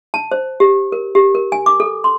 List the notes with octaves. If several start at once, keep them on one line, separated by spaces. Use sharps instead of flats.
A5
C5
G4
A#4
G4
A#4
G#5
D6
A4
C6